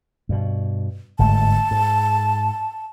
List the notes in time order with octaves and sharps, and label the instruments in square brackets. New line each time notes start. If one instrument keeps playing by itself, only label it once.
[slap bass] G2 B2
[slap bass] G1 G#2 A3 [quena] A5
[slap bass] G#2